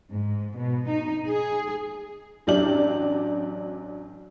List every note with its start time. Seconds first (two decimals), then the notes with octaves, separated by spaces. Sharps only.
0.12 G#2
0.58 B2
0.89 D#4
1.27 G#4
2.47 A1 F#3 D4 G4 D5 F#7